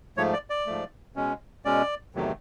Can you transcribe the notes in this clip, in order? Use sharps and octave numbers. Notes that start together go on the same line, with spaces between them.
G#2 F3 A3 C#5
D5
D5
G#2 F3 A3
B2 G#3 C#4
B2 G#3 C#4 D5
E2 C3 D#3 F#3 A3